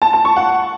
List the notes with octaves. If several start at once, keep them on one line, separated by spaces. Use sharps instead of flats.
A5
A5
C#6
F#5